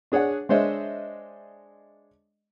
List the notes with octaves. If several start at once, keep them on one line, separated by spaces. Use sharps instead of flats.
D4 G#4 C#5 D5 F#5
G#3 D4 C5 C#5 D#5 E5